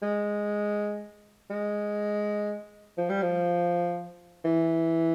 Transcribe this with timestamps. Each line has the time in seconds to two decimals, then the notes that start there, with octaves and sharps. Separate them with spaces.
0.02 G#3
1.50 G#3
2.98 F3
3.10 G3
3.22 F3
4.45 E3